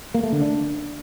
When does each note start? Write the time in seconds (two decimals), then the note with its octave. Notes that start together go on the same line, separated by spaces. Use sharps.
0.14 A#3
0.23 A3
0.32 D3
0.41 D4